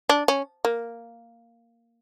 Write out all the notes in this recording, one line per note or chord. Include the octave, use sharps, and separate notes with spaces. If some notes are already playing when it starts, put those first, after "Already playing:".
D4
C#4
A#3